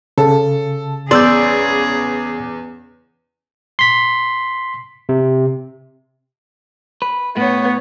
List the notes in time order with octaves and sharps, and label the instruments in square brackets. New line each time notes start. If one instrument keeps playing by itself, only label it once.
[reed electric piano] C#3 [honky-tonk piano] A4
[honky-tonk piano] E2 [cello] C#3 G#4 [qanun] D5 [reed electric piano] C6 E6 G6
[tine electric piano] C6 B6
C3
[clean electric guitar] B4
[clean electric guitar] A2 [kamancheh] B3 C#5